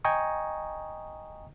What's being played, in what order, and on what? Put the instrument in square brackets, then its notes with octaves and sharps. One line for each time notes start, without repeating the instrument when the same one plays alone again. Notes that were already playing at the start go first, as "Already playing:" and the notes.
[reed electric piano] D#5 G5 G#5 A#5 C#6 D#6